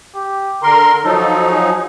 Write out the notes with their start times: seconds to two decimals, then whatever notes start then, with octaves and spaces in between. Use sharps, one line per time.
0.15 G4
0.63 D3 A#4 A#5 C6
1.04 F3 F#3 D#4 A4
1.49 G#4